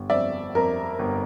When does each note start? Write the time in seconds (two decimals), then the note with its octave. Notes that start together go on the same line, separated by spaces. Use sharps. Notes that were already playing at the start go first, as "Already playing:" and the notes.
Already playing: G1
0.10 F2 D5 E5
0.55 F2 A#4
0.99 G1